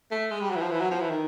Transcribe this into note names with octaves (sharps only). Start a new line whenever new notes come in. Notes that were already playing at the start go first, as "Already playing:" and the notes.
A3
G#3
G3
F#3
E3
F3
E3
F#3
F3
E3
D#3